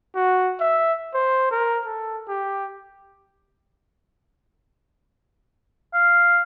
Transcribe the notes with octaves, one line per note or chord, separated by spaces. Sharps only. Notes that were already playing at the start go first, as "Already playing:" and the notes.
F#4
E5
C5
A#4
A4
G4
F5